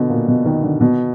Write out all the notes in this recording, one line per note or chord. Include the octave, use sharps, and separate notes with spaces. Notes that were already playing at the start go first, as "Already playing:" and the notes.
Already playing: B2 D3
A#2
B2
D#3
D3
B2